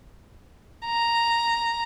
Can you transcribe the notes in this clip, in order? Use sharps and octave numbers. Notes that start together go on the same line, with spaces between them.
A#5